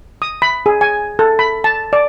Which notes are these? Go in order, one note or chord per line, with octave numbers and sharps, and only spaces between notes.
D#6
B5
G#4
G#5
A4
B5
A5
D5